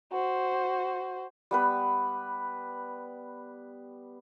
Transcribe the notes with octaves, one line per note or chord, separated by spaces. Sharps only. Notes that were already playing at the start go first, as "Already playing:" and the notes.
F#4 C5
G3 B3 B4